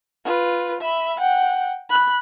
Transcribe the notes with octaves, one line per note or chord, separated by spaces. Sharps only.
F4 B4
E5 B5
F#5 G5
B5 F#6